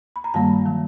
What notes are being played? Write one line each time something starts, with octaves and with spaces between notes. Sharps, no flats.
B5
A#5
G2 D#3 G3 A#3 A5
D#3 F#3